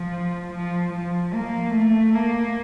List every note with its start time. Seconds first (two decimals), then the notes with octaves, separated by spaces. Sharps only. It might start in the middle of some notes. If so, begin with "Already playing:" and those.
Already playing: F3
0.53 F3
0.93 F3
1.34 A#3
1.74 A3
2.14 A#3